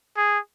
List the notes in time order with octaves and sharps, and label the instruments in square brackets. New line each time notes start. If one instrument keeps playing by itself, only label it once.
[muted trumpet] G#4